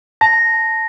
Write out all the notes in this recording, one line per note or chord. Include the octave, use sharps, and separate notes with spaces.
A5 A#6